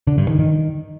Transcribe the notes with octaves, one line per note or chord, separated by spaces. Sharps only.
D3
G2
D#3
D#3